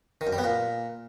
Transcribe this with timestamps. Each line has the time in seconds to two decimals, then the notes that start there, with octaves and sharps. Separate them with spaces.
0.21 D#3
0.27 F#2
0.33 G3
0.38 B3
0.44 A#2